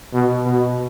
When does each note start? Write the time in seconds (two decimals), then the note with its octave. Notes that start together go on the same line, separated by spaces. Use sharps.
0.13 B2
0.43 B2